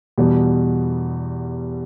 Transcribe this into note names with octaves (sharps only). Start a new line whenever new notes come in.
E2 B2 G3